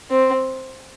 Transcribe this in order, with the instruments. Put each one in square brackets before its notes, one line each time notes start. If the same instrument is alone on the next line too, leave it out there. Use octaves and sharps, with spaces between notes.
[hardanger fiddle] C4